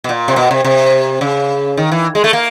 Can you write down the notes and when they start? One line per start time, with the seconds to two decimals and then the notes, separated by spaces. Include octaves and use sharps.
0.04 B2
0.09 A#2
0.28 C3
0.36 B2
0.51 C3
0.64 C3
1.21 C#3
1.77 D#3
1.92 E3
2.15 G#3
2.24 A3
2.33 A#3